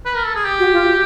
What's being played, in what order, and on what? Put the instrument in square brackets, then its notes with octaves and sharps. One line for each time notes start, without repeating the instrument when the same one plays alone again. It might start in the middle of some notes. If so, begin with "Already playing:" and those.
[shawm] B4
A#4
A4
G#4
G4
[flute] F#4
F4
F#4